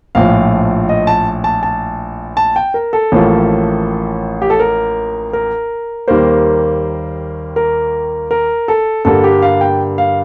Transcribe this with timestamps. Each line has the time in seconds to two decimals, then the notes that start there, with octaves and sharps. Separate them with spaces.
0.15 A#1 A2 F3 F5
0.89 D#5
1.07 A5
1.44 A5
1.63 A5
2.37 A5
2.56 G5
2.74 A#4
2.93 A4
3.12 A1 A2 F3 A#3
4.42 G4
4.50 A4
4.60 A#4
5.33 A#4
6.08 D#2 D#3 G3 A#3 C5
7.56 A#4
8.31 A#4
8.68 A4
9.05 G2 D3 G3 A#3 A4
9.24 G4
9.42 F5
9.61 G5
9.98 F5